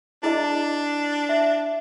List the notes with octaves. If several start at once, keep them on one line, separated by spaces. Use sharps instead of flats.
D4 E4 G#4 D#5
E5